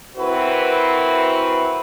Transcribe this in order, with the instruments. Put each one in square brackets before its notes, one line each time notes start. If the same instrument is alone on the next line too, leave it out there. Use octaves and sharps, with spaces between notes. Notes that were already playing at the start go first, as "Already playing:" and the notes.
[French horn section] E3 C4 E4 F#4 A#4 B4